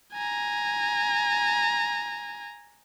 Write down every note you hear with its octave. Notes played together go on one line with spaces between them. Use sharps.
G#5 A#5